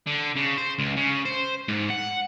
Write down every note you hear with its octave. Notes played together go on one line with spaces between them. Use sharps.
D3
C#3
C5
C#2
C#3
C5
G#2
F#5